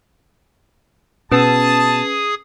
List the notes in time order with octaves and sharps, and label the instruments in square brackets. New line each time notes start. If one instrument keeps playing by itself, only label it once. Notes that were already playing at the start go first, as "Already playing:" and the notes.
[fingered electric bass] B2 [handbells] C#4 B4 [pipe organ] G#4 D#6 [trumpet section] A5